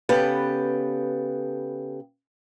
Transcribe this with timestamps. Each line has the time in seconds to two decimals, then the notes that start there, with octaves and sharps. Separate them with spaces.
0.09 C#3 B3 G4 A4 B4